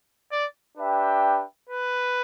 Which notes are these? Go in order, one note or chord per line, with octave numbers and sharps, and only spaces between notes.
D5
D4 G4 B4 E5 G5
B4